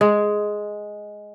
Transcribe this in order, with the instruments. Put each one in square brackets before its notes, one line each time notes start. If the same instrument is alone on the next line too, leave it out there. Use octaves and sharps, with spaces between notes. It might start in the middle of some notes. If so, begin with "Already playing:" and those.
[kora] G#3